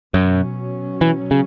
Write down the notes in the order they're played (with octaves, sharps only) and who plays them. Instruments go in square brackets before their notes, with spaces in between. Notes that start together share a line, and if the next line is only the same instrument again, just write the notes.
[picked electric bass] F#2 [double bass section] B2 F#3 C#4
[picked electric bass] E3
C#3